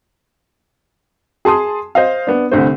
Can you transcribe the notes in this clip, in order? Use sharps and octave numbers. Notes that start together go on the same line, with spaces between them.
G#4 A5 C6 D#6
C5 D#5 F5
B3 D4
C2 D3 A3 C5